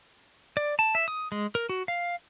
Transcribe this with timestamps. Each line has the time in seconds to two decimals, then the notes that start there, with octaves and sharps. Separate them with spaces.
0.57 D5
0.79 A5
0.95 E5
1.08 D#6
1.32 G#3
1.55 A#4
1.69 F#4
1.88 F5